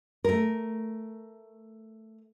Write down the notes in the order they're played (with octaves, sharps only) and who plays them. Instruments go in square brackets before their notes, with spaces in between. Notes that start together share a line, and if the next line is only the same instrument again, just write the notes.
[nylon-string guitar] A3 A#4